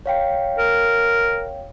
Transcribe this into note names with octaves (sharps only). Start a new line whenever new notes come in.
C#5 F5 G5
A#4